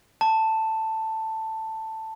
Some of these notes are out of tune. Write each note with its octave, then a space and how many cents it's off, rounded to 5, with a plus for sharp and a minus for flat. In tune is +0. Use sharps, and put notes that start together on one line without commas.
A5 +10